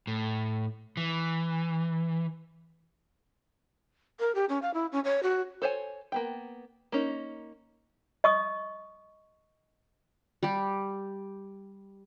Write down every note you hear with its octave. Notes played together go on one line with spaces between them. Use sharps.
A2
E3
A#4
G4
C#4
F5
E4
C#4
C#5
F#4
A4 C5 C#5 E5 G#5
A#3 B3 G5
A#3 C#4 D#4
D#5 C#6 D#6
G3 G4